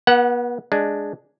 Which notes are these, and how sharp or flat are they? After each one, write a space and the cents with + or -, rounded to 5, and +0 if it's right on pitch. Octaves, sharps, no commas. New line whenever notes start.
B3 -40 F#5 +0
G#3 +0 D4 +0